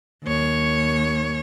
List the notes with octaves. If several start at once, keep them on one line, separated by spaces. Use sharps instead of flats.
D#2 C#5